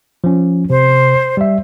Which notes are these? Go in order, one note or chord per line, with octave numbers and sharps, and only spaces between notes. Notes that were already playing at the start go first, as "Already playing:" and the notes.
F3 C#4
C3 C5
G3 E5